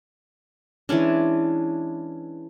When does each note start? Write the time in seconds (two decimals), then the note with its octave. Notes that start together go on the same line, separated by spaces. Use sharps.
0.89 E3 G#3 C#4 D4